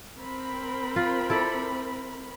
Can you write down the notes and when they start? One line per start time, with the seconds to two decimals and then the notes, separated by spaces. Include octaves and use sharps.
0.19 C4 A#4 B5
0.96 F4
1.30 E4 A4 D5